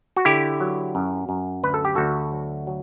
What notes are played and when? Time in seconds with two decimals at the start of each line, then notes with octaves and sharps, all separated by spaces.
0.16 F#4
0.25 D3 E4 G4
0.60 F#3
0.95 F#2
1.29 F#2
1.63 D2 B4
1.74 A4
1.85 G4
1.95 D2 F#4 A4
2.32 F#3
2.67 F#3